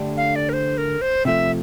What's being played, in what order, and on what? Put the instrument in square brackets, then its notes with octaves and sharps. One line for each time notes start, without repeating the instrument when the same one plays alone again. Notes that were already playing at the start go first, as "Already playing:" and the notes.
Already playing: [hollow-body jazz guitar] D3 A3 D4 G4
[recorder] F5
D5
A#4
C5
A#4
C5
[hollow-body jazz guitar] C3 F3 A3 [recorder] E5